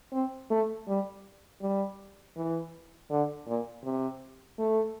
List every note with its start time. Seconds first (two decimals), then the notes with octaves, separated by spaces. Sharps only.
0.12 C4
0.50 A3
0.87 G3
1.61 G3
2.36 E3
3.10 D3
3.47 A#2
3.84 C3
4.59 A3